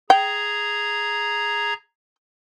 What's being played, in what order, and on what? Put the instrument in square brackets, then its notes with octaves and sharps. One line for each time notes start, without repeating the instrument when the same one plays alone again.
[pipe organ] G#4 A#5 G#6 [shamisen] G5